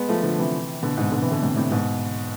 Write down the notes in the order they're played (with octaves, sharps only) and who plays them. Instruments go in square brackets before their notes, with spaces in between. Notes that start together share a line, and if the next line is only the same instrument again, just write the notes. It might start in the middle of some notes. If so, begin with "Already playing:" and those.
Already playing: [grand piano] G#3 B3
F3 A3
D3 F3
C3 E3
B2 D3
G#2 B2
B2 D3
C3 E3
B2 D3
A2 C3
A2 C3
G#2 B2